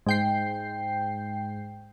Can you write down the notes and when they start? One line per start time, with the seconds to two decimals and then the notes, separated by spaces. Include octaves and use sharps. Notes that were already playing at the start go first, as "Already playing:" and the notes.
0.07 G#2 G5 C7